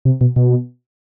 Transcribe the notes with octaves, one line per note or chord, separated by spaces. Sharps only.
C3
B2
B2